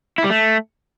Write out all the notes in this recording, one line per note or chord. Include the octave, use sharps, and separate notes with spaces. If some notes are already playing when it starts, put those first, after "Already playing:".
E4
G3
A3